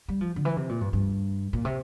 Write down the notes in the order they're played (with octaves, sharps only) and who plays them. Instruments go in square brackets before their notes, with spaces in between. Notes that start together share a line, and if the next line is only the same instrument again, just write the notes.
[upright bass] G3
F3
D3
E3
C3
A#2
G2
G2
A#2
C3